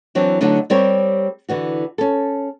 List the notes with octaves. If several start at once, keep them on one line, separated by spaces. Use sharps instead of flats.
E3 F#3 C4 D4
D3 F#3 A3 D4 D#4
G3 C4 G4 A#4 C#5
D3 E3 F#4
C#4 A4